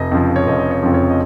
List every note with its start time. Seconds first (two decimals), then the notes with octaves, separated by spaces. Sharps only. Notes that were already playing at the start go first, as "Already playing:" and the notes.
Already playing: F1 D#5
0.12 F2 C#3 F3
0.36 C#5
0.46 F1 D#5
0.59 D#5
0.71 C#5
0.82 F2 C#3 F3
0.94 C#5
1.10 D#5